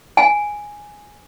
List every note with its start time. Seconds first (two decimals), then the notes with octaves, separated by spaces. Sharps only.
0.17 G#5